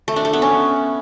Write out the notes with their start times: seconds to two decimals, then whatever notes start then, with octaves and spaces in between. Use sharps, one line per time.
0.08 A3
0.16 D4
0.25 A3
0.33 B3
0.42 C#4